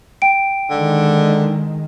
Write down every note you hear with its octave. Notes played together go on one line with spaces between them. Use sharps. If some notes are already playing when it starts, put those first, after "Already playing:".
G5 D7
D3 D#3 G#3